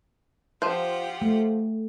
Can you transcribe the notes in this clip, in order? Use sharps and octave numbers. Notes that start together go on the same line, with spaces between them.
F3 F4 G4 C5 F#5
A3